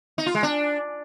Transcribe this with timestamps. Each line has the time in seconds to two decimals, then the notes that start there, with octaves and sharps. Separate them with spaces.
0.18 D#4
0.26 F4
0.35 G#3
0.43 D4